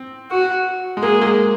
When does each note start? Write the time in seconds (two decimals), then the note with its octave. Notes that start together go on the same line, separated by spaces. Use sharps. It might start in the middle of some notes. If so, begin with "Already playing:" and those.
Already playing: C4
0.31 F#4
0.97 G#3
1.03 A#3 G#4
1.22 A#3
1.26 G#3